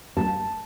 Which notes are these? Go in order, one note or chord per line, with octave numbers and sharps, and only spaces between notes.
A5